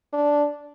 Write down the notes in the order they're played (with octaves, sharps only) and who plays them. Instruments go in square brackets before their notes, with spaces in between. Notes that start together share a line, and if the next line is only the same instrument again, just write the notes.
[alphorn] D4